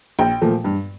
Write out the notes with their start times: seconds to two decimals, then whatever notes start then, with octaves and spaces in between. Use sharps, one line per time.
0.19 A#1 G5
0.42 A#2 F3 A3
0.64 G2